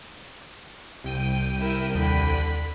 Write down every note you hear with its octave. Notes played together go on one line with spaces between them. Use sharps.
C2 G5 D#7
E4 A#4
D#2 D3 B5